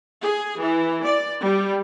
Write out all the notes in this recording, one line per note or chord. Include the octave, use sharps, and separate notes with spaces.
G#4
E3
D5
G3